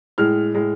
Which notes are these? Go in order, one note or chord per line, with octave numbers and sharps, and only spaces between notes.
A2 G#3 F6
A2 G#3